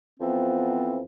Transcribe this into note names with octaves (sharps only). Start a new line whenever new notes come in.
F2 E3 F3 B3 C4